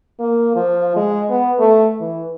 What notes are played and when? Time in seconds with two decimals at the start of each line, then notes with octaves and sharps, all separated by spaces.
0.20 A#3
0.56 F3
0.96 G#3
1.29 B3
1.59 A3
2.01 E3